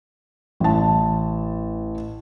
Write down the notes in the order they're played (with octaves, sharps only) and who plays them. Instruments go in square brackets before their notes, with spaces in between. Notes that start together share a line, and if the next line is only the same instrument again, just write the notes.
[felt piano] A1 A5